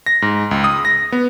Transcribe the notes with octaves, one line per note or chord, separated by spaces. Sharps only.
A#6
G#2
C#2
D#6
A#6
B3